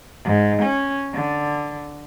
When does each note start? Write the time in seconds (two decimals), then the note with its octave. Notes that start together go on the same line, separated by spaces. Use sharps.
0.24 G#2
0.62 C#4
1.14 D3